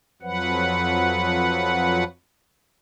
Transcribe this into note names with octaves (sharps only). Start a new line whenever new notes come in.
F2 F3 F#3 B4 F#5